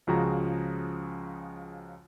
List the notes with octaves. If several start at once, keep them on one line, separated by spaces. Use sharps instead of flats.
C#2 C#3 F3 F#4 G#4 A#5